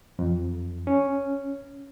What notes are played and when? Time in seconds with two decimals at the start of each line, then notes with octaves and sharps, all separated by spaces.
0.19 F2
0.87 C#4